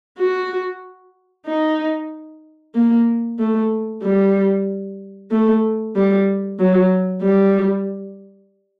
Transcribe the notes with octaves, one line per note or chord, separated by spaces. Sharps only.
F#4
D#4
A#3
A3
G3
A3
G3
F#3
G3